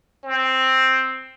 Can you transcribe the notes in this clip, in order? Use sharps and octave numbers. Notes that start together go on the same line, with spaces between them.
C4